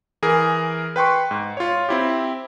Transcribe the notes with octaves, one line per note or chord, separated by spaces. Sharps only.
E3 G#4 A#4
B4 G5 C6 C#6
G#2
F4 C#5
C4 E4 G4